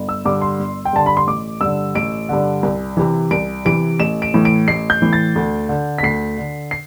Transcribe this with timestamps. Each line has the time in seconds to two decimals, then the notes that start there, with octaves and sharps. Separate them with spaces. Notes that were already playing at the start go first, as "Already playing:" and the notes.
Already playing: G1
0.09 E6
0.25 G2 D3 D6
0.42 C6
0.60 G1
0.85 G5
0.93 G2 D3 A5
1.06 B5
1.17 C6
1.27 A1 D6
1.61 G2 D3 E6
1.95 A1 D7
2.29 G2 D3
2.63 C2
2.97 C3 E3
3.31 C2 D7
3.65 C3 E3 D7
4.00 A1 E7
4.22 D7
4.34 A2 E3
4.45 D7
4.67 A1 C7
4.90 G6
5.02 A2 E3
5.13 A6
5.36 D2
5.69 D3
5.98 B6
6.03 D2 C7
6.38 D3
6.71 C7